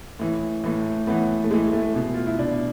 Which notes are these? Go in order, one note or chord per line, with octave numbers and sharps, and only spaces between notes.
A2 E3
A2 E3
A2 E3 B3
A3
A2 E3 G#3
A3
B2
F4
E4
B2 D4